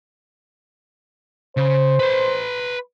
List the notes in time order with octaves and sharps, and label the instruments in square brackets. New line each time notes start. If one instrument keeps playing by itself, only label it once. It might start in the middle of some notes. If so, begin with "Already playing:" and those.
[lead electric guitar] C#3 [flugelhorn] C5
[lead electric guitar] B4 C6